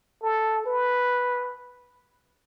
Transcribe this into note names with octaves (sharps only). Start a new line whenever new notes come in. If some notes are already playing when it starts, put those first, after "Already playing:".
A4
B4